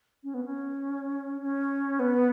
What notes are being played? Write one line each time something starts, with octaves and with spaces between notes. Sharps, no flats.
C#4
B3
C#4
C#4
B3